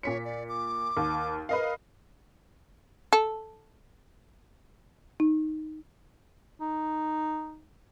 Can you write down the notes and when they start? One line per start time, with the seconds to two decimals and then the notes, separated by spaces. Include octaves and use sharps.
0.03 A#2 C#5 B6 C#7
0.25 D5
0.49 D6
0.97 D#2
1.49 A#4 B4 D#5 F5
3.13 A4
5.20 D#4
6.60 D#4